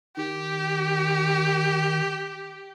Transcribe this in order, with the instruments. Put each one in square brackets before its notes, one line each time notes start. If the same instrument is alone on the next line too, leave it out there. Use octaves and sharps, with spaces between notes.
[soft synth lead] D#3 [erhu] G4